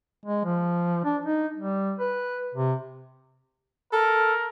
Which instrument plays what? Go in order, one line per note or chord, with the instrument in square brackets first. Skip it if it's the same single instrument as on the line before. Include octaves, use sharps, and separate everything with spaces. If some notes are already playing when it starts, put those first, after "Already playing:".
[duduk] G#3
F3
D4
D#4
G3
B4
C3
[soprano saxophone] A4 [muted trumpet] A#4